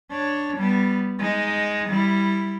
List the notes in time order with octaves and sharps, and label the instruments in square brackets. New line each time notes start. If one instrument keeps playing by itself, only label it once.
[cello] D4 C#5
G3 B3
G#3 D#4
G3 E4